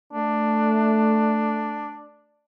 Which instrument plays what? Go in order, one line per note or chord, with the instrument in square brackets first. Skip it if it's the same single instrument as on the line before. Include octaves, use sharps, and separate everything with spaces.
[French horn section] A3 [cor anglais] D4